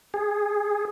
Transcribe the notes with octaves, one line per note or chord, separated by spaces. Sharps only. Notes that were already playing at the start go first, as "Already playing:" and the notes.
G#4